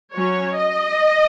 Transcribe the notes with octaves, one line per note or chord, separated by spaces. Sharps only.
F#3 C#4 C#5
D#5